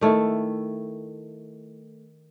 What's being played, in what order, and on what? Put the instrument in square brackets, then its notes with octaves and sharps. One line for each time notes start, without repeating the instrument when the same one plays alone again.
[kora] D#3 A3 E4